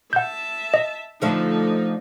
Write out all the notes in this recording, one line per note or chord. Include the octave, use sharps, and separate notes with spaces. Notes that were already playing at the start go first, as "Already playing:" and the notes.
E5 F#5 A5 G6
D#5
D3 F3 A3 D#4